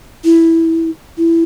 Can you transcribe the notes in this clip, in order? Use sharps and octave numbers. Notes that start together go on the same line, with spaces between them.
E4
E4